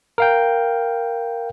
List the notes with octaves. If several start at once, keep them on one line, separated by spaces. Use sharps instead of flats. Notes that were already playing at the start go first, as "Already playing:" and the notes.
A#4 F5 G5